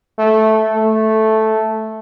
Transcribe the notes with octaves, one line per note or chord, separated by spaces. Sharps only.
A3
A3